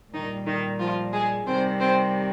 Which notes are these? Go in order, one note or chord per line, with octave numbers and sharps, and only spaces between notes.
A#2 D#3 G3 D#4
D#3 D#4
F3 F4
G#3 G#4
C3 D#3 G3 C4 C5
C4 C5